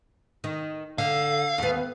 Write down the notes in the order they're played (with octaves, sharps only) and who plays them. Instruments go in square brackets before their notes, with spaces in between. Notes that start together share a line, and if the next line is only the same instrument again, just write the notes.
[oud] D#3
[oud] D3 [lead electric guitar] F5
[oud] D#2 B3